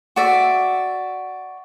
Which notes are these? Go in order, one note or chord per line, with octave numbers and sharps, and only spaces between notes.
F#4 D5 E5